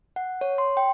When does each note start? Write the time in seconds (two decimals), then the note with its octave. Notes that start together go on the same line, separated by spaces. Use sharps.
0.16 F#5
0.41 C#5
0.58 C6
0.77 G5